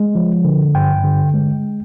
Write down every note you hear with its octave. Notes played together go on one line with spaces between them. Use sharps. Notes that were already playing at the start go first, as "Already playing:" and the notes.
Already playing: G#3
F3
D3
G2 G5
D3
G#3